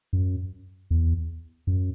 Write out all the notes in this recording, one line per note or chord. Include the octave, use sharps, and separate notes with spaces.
F#2
E2
F#2